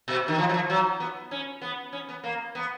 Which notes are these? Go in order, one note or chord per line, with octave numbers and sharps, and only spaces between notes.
B2
D#3
F3
F#3
F3
F#3
B3
C#4
B3
C#4
B3
A#3
B3